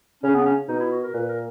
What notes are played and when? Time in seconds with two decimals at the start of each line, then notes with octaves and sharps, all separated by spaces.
0.23 C#3 C#4
0.34 B3
0.46 C#4
0.68 B2 D#4
0.80 E4
0.91 F#4
1.03 A#4
1.14 A#2 B4
1.29 A#4